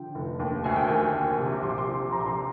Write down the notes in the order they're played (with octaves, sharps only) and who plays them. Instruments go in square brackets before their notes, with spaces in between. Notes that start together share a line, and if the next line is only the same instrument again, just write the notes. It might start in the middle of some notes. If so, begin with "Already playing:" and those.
Already playing: [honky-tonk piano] D3 F3 G5
F1
D#2
D2 G#5
G5
D#3 G#5
D2
C3
A#1 C6
D6
C6
F3
A#1 A#5
C6
A#5